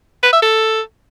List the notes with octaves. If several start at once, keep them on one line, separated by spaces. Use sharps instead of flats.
B4
E5
A4